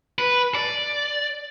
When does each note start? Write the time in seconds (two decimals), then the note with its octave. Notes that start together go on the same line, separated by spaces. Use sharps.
0.18 B4
0.55 D5